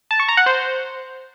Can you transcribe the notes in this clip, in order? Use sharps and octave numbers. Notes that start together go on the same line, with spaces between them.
A5
C#6
A#5
F#5
C5